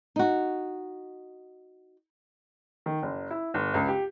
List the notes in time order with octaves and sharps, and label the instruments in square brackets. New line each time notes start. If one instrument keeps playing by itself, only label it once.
[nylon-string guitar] D#4 F#4
[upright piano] D#3
F#1
E4
G1
C#2
G4